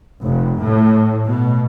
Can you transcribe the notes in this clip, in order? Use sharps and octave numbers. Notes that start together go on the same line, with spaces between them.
F1
A2
B2